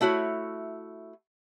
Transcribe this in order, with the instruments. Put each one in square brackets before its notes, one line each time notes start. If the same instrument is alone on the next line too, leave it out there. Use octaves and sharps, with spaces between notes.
[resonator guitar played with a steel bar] A3 E4 F#4 C#5